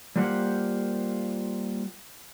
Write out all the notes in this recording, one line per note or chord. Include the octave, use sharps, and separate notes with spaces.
G3 A#3 F4 G4 C5 F#5